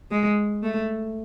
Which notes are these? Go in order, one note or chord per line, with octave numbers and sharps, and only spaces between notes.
G#3
A3